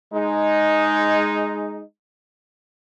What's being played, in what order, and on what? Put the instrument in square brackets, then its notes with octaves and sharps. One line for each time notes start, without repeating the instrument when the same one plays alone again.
[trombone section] G#3 D#4